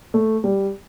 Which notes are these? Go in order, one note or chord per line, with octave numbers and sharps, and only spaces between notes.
A3
G3